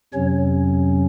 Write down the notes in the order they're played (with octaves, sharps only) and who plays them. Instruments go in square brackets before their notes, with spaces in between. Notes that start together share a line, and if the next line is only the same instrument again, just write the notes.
[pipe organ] F2 C3 F#3 C#4 C#5